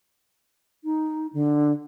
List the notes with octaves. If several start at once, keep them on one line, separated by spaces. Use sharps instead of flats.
D#4
D3